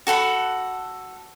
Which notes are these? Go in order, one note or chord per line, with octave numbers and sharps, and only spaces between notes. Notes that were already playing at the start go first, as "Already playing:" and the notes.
F#4 A4 F#5 B5